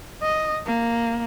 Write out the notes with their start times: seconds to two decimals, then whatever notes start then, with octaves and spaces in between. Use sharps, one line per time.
0.22 D#5
0.66 A#3